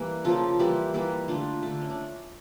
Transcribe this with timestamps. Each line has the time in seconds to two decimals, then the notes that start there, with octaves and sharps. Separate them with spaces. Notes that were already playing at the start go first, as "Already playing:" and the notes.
Already playing: E3 G3 A#3 G4
0.24 C#3 F3 A#3 F4 A4
0.59 E3 G3 A#3 E4 G4
0.94 E3 G3 A#3
1.28 D3 A3 D4 F4
1.63 D3 A3
1.81 C#4
1.90 D4